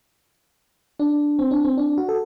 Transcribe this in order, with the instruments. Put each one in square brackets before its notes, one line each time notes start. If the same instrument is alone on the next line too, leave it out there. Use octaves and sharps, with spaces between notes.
[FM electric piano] D4
C4
D4
C4
D4
F#4
A4